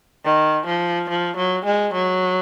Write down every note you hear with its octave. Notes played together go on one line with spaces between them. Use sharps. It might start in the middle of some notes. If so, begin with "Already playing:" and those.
D#3
F3
F3
F#3
G#3
F#3